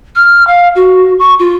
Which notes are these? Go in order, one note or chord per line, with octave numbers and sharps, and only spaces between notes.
F6
F5
F#4
C#6
F4